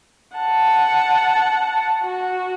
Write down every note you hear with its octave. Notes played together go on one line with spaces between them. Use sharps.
F#5 A5
F#4